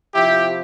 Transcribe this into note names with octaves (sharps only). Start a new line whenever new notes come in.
C3 F3 E4 G4